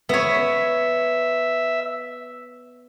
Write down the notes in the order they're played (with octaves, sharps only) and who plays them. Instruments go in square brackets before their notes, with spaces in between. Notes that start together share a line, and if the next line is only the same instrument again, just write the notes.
[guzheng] B3 C#5 [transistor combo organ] E5